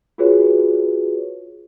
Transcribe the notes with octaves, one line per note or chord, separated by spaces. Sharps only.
F4 F#4 G#4 B4 C#5